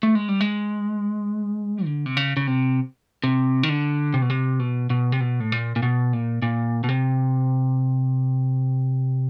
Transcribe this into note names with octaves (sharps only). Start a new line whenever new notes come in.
A3
G#3
G3
G#3
D3
C3
C#3
C#3
C3
C3
D#3
D3
C3
B2
C3
B2
B2
C3
B2
A2
A#2
A#2
B2
A#2
A#2
B2
C3